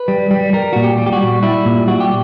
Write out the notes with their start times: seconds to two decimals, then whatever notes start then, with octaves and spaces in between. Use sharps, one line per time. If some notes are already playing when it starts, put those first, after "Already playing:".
Already playing: B4
0.08 G3
0.31 G3
0.53 G3 A#4
0.73 A#2 F#4
0.83 G4
0.98 G3
1.06 G4
1.13 F#4
1.20 G3
1.43 G3 E4
1.65 A#2
1.87 G3 F#4
2.00 G4